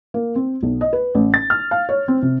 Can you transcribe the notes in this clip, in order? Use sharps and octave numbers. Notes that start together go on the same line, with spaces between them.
A#3
C4
B1
D#5
B4
A1
A6
F6
F5
C#5
C4
C3